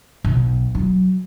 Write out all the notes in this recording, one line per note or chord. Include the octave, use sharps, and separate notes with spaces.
B1
F#3